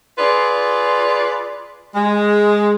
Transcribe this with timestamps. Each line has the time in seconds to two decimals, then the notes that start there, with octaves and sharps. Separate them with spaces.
0.17 F4 G#4 B4 D5
1.94 G#3